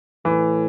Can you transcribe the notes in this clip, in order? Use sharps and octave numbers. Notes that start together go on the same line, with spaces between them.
A2 E3